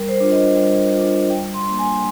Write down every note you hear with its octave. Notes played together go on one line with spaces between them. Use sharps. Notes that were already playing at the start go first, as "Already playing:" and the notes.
Already playing: G3 A#4
C5
D4 F4
D#5
G3
D4 F4
G3 G5
C6
A#3 D4
G#5